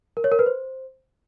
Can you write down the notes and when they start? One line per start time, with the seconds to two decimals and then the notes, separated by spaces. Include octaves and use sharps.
0.17 A#4
0.24 C#5
0.32 A#4
0.39 B4
0.46 C5